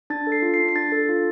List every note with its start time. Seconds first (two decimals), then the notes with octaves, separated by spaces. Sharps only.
0.10 D4 A6
0.27 A4
0.32 C7
0.42 F4
0.54 C7
0.59 D4
0.69 C7
0.76 D4 A6
0.92 A4
1.09 F4